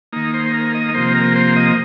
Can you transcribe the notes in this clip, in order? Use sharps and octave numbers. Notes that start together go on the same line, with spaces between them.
D#3 A#3 D#4
C5
A#4
D#5
A#4
C3 F3 A#3 C5
A#4
C5
D#5